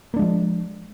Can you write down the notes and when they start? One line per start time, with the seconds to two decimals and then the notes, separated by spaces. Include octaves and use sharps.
0.14 A#3
0.16 D4
0.19 G#3
0.22 F3